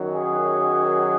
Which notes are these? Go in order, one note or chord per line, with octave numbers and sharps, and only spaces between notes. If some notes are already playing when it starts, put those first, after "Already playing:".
Already playing: F#2 D#3 F#3
G#4